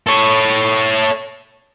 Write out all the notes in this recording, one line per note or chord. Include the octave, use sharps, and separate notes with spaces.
A4 C#5